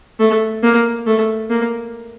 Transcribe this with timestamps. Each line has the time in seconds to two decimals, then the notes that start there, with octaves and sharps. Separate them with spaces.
0.19 A3
0.63 A#3
1.07 A3
1.50 A#3